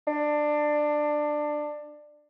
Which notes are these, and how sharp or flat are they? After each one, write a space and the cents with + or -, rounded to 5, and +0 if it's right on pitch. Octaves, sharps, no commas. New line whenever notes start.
D4 +20